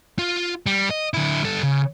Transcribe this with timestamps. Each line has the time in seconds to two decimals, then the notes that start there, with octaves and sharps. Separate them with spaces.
0.19 F4
0.66 G3
0.90 D#5
1.14 D3 E4
1.42 G3 A4
1.63 C#3